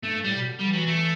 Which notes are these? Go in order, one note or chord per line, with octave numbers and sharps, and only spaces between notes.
G2 A3
G2
A2 G3
B2
D3
G3
E3
F#3
A3